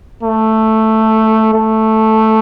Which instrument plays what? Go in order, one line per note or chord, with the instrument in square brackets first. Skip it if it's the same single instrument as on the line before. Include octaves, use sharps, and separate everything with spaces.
[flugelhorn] A3
A3